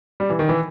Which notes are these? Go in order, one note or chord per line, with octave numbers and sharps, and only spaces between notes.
G3
E3
D#3
E3